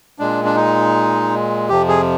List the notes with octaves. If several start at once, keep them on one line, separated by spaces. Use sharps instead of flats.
A#2 G#3 D4
D4
D#4
F2 C3 F3 G4
G#4